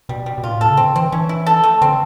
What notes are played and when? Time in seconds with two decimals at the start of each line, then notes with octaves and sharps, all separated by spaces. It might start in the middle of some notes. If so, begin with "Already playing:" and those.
0.09 B2 G3
0.26 G3
0.38 B2
0.43 A#2 F4
0.52 A2
0.61 A#2 A4
0.70 C#3
0.77 D3 C4
0.95 E3 C4
1.12 E3 C#4
1.29 E4
1.46 A4
1.64 A3
1.82 D3 C4